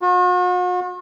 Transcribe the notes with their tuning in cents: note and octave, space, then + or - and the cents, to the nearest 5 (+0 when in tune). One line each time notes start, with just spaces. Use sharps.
F#4 -45